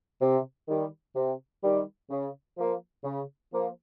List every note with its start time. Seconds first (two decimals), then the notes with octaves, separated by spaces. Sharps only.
0.21 C3
0.68 D#3 G3
1.15 C3
1.63 D#3 G3
2.10 C#3
2.57 F3 A#3
3.04 C#3
3.52 F3 A#3